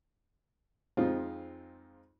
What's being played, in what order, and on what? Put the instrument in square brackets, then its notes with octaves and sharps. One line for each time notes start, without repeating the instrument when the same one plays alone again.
[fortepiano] F2 G#3 C4 D#4 F4